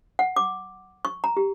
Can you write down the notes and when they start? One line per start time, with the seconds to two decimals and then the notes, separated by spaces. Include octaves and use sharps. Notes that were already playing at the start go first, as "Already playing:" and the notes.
0.19 F#5
0.36 D6
1.05 C#6
1.24 A#5
1.37 G4